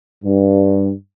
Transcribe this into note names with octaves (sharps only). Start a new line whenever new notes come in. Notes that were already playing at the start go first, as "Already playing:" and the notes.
G2